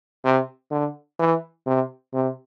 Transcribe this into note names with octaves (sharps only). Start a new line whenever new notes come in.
C3
D3
E3
C3
C3